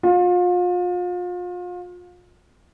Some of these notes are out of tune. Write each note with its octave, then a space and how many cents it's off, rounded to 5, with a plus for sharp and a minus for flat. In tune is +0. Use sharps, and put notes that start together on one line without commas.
F4 +35